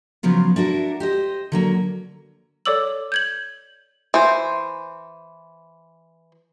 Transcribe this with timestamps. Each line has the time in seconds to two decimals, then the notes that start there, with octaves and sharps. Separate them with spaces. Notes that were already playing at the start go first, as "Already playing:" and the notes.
0.23 C#3 F3 F#3 B3 F4
0.56 D4 E4 F#4 A#4
1.00 G4 C5 D#5
1.52 D3 F#3 A#3
2.66 A4 C#5 D5 D6 E6 F#7
3.12 G6 G#6 F#7
4.14 E3 C5